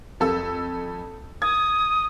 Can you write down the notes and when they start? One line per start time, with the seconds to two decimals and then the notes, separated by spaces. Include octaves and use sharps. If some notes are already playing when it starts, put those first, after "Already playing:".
0.20 F2 A4 E6
1.42 D#6 G#6